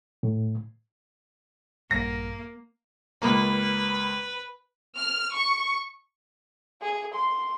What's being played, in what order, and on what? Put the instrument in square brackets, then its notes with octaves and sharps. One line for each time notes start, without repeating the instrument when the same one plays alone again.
[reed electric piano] A2
[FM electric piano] A#1 G2 [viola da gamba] A#3 [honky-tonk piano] A#6
[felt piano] C#2 A#3 [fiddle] B4
[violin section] F6
C#6
[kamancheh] G#4
C6